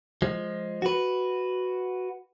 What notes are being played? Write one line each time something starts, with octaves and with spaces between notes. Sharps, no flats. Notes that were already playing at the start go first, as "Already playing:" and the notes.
F3 G#3
F#4 B4